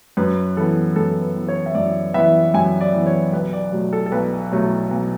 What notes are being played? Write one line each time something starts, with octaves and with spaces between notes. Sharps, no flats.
F#2 B4
E3 B3 A4
F#2 A4
B4
E3 B3
C#5
E5
F#2 D5
E3 B3 E5
F#2 G#5
D5
E3 B3
C#5
B1 B4
D5
B2 F#3 A3
A4
A4
B1 B4
B2 F#3 A3
B1